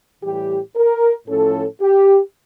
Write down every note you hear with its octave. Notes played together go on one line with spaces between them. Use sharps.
A2 E3 G3 G4
A#4
A2 F3 C#4 A4
G4